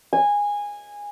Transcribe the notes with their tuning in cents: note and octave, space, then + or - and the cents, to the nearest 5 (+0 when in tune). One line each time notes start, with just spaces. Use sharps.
G#5 -15